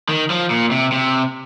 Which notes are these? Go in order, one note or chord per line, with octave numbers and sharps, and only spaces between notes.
D#3
F3
A#2
C3
C3